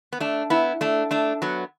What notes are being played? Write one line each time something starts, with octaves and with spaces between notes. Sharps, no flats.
B3
A3 D4
B3 E4
A3 D4
A3 D4
F#3 B3